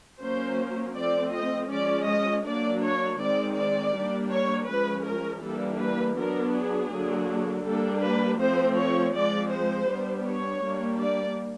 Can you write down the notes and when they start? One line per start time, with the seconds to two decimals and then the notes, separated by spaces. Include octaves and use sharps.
0.22 F#3 A#3 C#4 C5
0.96 F3 A3 C4 D5
1.33 D#5
1.71 F3 G#3 C#4 D5
2.08 D#5
2.46 F#3 A#3 D4 D5
2.82 C#5
3.19 D#3 G#3 C4 D5
3.57 D5
3.94 G3 A#3 D4
4.31 C#5
4.68 F3 G#3 C#4 B4
5.06 A#4
5.42 E3 G3 A#3 D4 A4
5.81 B4
6.17 F#3 B3 D4 A#4
6.54 G#4
6.92 D3 F#3 A#3 D4
7.66 G3 A#3 D4 A4
8.03 B4
8.40 F3 A3 C4 C5
8.78 C#5
9.15 F3 G#3 C4 D5
9.53 C5
9.89 G3 B3 D4
10.27 C#5
10.64 G3 A#3 D4
11.02 D5